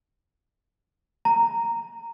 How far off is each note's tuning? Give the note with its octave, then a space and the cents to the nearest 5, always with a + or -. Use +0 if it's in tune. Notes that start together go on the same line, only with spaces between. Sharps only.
A#5 -10